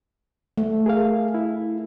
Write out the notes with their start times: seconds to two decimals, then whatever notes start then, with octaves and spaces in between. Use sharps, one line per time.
0.58 A3
0.86 G#4 A#4 F5
1.34 E4